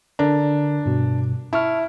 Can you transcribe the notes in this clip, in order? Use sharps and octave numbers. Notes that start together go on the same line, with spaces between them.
D3 D4 A#4 A#5
G2 B2
E4 A5 C#6 F6